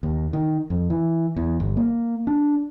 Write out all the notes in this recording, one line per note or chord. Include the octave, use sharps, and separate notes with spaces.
D#2
D#3
F2
E3
E2
G1
A#3
D4